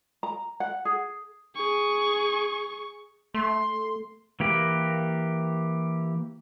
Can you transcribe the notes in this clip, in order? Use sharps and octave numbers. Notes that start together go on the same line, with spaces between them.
A#5
F#5
G#4
G#4 C#6
A3 C6
E3 A#3 G4